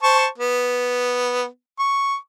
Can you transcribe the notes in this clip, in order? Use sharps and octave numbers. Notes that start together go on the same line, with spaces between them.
C5 A5 C#6
B3
C#6